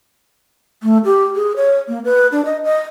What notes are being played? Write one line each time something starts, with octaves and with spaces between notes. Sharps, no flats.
A3
G4
G#4
C#5
A#3
B4
D4
D#5
D#5